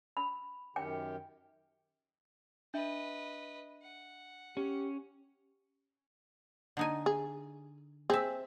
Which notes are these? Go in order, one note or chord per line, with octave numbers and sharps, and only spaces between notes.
B5
F#2 D#3 G4 G5
D4 B4 D#5 E5
F#5
C#4 G4
D3 D#4 G#5
G#4
C4 G#4 E5